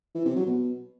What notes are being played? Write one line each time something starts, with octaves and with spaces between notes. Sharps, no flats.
E3
C3
F#3
B2